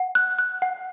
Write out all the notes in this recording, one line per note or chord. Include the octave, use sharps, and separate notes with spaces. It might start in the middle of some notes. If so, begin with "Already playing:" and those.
Already playing: F#5
F#6
F#6
F#5